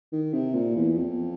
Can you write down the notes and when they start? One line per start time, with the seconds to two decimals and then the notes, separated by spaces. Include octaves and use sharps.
0.12 D#3
0.33 C3
0.55 A#2
0.76 E2
0.97 F2